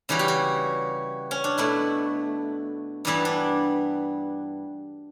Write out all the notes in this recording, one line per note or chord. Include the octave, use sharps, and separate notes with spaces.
C#3 E3 G3 F#4
G4
F#4
C#4
D4
B2 A3 E4
G2 E3 G3 B3 E4
D4